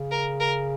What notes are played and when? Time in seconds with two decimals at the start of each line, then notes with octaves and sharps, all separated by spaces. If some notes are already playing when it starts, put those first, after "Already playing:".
Already playing: C#3
0.11 A#4
0.40 A#4